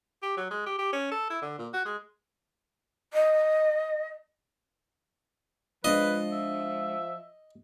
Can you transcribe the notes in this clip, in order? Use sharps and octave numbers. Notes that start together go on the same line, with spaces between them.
G4
F#3
G#3
G4
G4
C#4
A4
E4
D3
A#2
F#4
G#3
D#5
F3 G#3 D4 F4 B4 D#5
E5